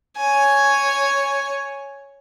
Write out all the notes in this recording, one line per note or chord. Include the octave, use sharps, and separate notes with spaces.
C#5 G#5